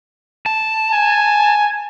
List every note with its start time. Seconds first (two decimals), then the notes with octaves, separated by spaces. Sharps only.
0.46 A5
0.93 G#5